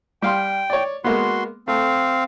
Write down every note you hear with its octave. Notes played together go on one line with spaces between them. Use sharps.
G3 F5 G5 C6
C#5 D5
G#3 A#3 B3 F#4 C6
A3 C4 F5